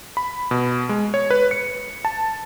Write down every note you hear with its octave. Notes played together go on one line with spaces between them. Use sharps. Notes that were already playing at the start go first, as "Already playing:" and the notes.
B5
B2
G#3
C#5
B4
C#7
A5